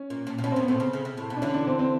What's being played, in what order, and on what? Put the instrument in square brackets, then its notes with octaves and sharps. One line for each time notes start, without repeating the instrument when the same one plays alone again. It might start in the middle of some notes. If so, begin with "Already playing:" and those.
Already playing: [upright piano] C#4
[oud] A#2
A#2
A#2
[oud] B2 [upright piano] C#4
[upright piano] C4
[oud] A#2 [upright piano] B3
[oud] A2 [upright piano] C4
[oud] C#3
C#3
C3
A2
B2
[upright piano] D4
[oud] D3 E3 [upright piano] C#4
[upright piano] D4
C4
C4